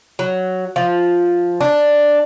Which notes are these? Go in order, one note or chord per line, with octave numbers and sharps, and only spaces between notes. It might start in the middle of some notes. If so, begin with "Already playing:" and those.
F#3
F3
D4